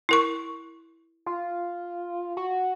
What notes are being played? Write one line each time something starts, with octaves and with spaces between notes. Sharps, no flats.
E4 A#4 C#6
F4
F#4